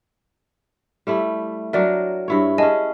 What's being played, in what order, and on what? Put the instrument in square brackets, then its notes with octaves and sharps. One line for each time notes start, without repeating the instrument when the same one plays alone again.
[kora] G3 A3 E4
[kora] F#3 D4 A#4 [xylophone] D5 E5
[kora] G2 E4 C#5
[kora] C#4 G#4 [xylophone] D#5 G#5 A5